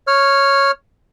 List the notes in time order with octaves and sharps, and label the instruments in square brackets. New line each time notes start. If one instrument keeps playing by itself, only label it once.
[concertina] C#5 F6